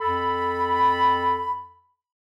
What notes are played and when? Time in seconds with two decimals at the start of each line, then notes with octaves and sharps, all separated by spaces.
0.01 F2 A4 B5